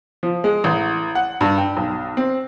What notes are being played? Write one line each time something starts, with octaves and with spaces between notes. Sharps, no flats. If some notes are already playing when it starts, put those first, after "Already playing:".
F3
G#3
A1
F#5
G2
G5
B1
C4